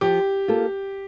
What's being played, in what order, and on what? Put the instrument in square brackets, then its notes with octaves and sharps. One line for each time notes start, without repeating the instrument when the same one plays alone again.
[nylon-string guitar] F3 [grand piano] G4
[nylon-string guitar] A#3 F4 A4